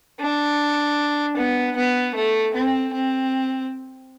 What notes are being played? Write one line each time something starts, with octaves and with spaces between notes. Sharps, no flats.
D4
B3
B3
A3
C4
C4